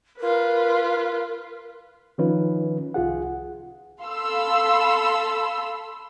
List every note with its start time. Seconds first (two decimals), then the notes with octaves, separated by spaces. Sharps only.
0.20 F4 A#4 B4
2.18 D#3 F3 C#4 D#4 F4 B4
2.94 C2 F4 G#4 F#5
4.01 A4 F5 B5 C6 E6